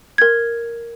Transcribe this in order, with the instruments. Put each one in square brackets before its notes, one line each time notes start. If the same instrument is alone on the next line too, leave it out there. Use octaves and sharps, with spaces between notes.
[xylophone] A#4 G#6